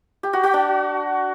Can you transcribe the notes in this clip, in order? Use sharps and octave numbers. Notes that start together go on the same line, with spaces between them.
G4
F#4
F#4
D4